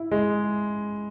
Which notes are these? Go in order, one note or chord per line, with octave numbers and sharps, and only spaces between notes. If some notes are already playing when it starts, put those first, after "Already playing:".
Already playing: E4
G#3